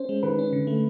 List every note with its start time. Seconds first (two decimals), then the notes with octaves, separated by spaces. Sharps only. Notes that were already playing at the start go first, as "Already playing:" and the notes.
Already playing: C#4 C5
0.09 G#3
0.23 D#3 B4
0.39 C#4
0.53 D3
0.67 A3